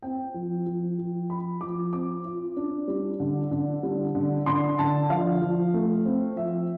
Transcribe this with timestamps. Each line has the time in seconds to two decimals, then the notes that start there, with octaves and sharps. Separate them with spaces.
0.02 C4 G5
0.34 F3
0.66 F3
0.98 F3
1.30 F3 B5
1.61 F3 D6
1.92 C4 D6
2.25 F4
2.57 D4
2.88 G3
3.20 D3
3.51 D3
3.83 G3
4.15 D3
4.46 D3 C6
4.79 D3 A5
5.09 F3 F5
5.42 F3
5.74 A3
6.05 C4
6.36 F3 E5